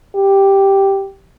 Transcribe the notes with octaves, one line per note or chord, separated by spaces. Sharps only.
G4